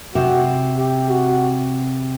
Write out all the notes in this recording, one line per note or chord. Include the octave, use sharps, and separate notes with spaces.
C3 F#4
G4
F#4